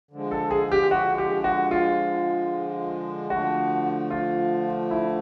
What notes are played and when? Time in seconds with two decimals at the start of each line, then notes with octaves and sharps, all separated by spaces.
0.11 D3 F3 G#3
0.31 A4
0.51 G#4
0.72 G4
0.91 F#4
1.18 G4
1.44 F#4
1.71 F4
3.30 D3 F3 A3 F#4
4.11 F4
4.91 E4